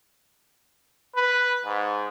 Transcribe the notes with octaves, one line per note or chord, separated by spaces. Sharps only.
B4
G#2